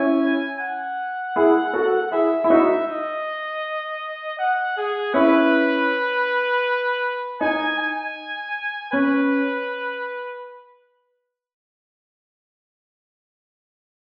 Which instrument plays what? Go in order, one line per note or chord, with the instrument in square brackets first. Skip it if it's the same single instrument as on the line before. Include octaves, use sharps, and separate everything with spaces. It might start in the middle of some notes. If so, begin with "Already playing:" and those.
Already playing: [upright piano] C#4 E4 [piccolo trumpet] G#5
[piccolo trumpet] F#5
[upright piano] E4 G#4
F#4 A4
[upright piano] E4 G#4 [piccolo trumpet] E5
[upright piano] E4
[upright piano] D#4 F#4 [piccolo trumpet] E5
[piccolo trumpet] D#5
F#5
G#4
[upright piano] C#4 E4 [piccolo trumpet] B4
[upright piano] D#4 [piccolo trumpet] G#5
[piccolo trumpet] G#5
[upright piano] C#4 [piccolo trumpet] B4